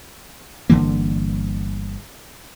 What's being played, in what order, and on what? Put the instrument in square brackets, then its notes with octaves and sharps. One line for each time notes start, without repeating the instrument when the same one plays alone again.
[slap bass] G1 D3 E3 A#3